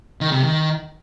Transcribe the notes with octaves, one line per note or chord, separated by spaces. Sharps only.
D#3
C3
D#3